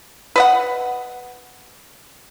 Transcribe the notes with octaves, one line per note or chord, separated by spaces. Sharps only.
B4 D#5 F#5